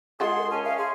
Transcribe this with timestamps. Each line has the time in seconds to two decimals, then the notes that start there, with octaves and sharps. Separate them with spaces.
0.20 G#3 F4 G#4 A4 F#5 C6
0.38 A#4
0.51 C#4 G#5 A5
0.64 E5 F5
0.78 G#4 C6